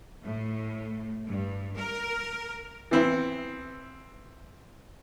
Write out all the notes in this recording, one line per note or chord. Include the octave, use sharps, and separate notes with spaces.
A2
G2
A#4
E3 B3 C4 E4